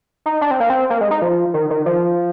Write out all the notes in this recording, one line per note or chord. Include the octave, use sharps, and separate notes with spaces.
D#4
D4
C4
A#3
C4
A#3
G#3
D#4
F3
D#3
D#3
F3